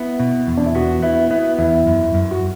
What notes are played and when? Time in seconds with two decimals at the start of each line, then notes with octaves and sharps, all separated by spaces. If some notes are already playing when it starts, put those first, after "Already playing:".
Already playing: B3 E4
0.20 B2
0.47 E2
0.57 D4
0.66 E4
0.75 B3 F#4
1.02 B3 E4
1.31 B3 E4
1.58 E2 E4
1.87 F#2
2.14 F#2
2.31 F#4